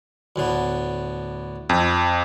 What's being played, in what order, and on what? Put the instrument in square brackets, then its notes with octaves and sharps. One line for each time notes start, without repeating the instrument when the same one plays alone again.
[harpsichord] D2 A2 B3
[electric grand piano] F2